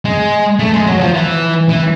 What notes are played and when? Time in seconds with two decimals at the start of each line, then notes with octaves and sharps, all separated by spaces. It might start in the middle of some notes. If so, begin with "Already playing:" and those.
0.05 G#3
0.59 A3
0.73 G#3
0.87 F#3
1.01 F3
1.14 E3
1.69 E3